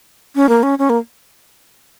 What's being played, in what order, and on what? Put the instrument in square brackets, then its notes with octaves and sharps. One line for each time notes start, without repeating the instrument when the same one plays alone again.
[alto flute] C#4
A#3
C#4
C#4
A#3